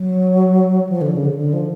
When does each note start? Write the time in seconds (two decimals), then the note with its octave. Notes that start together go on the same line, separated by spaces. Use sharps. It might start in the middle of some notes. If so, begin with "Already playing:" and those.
Already playing: F#3
0.89 F3
1.01 D3
1.13 C#3
1.25 D3
1.37 D3
1.53 F3